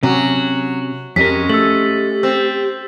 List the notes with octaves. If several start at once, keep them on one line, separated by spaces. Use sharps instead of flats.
C3 F#3 C#4
F2 G#3 C#4 G4 A#4 B6
A3 G4 E6 A6 F#7
C4 E6